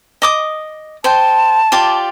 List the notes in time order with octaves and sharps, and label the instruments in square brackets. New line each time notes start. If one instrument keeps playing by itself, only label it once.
[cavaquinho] D#5 D6 D#6
[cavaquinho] C5 G5 [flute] A5
[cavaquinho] F4 G4 D5